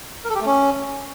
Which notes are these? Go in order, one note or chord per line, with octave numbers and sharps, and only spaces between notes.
A#4
A4
G4
A3
C#4